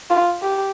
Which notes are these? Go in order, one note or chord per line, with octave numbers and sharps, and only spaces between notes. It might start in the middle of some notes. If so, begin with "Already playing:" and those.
F4
G4